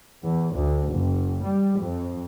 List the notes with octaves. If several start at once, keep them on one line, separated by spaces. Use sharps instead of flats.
E2
D2
F#1
G3
F2